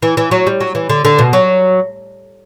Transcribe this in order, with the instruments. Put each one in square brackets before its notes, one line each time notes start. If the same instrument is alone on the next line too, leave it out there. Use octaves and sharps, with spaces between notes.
[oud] E3
E3
F#3
G3
F#3
E3
D3
D3
B2
F#3